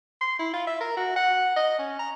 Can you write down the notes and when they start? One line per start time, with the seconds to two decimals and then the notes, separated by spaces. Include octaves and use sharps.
0.21 C6
0.39 E4
0.53 F4
0.67 E5
0.80 A#4
0.97 F#4
1.16 F#5
1.56 D#5
1.79 C#4
1.99 A#5